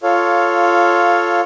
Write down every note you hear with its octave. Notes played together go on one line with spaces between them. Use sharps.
F4 A4 C#5 F5